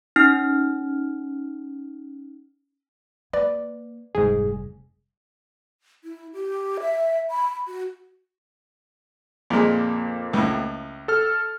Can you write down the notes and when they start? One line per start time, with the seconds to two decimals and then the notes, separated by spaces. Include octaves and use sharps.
0.16 C#4 D#4 F6
3.33 A#3 B4 D5
4.15 F1 G#2 G3 G#4
6.04 E4
6.33 G4
6.81 E5
7.30 B5
7.67 F#4
9.50 F2 A#2 G#3 A#3
10.33 C#2 A2
11.08 A4 F6